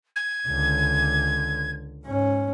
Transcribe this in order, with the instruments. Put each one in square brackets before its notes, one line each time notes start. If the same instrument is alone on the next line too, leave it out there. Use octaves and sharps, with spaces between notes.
[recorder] G#6
[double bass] C#2 D3
G#2 C#4